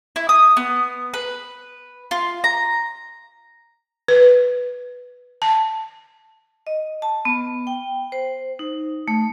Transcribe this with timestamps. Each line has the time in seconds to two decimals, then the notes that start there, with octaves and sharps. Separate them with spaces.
0.16 E4
0.29 D#6
0.57 B3
1.14 B4
2.11 F4
2.44 A#5
4.08 B4
5.42 A5
6.67 D#5
7.02 A5
7.25 B3
7.67 G5
8.12 C5
8.59 D#4
9.08 A3